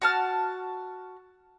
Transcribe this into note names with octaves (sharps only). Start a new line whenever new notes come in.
F#4 A5 F6